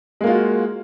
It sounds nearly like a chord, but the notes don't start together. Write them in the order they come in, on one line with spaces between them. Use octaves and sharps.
G#3 A#3 F4 F#4